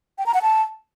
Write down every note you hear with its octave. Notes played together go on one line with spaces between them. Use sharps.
G5
A#5
F#5
A5